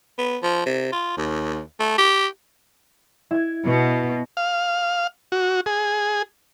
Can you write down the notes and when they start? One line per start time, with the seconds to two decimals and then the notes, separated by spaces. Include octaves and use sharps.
0.18 B3
0.43 F3
0.66 C3
0.92 F4
1.17 D#2
1.80 A3
1.98 G4
3.31 E4 G#6
3.66 B2
4.37 F5
5.32 F#4
5.66 G#4